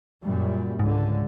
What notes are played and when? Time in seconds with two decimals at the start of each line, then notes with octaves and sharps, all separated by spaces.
0.23 F#2 A#2 G3
0.79 C#2 G#2 D3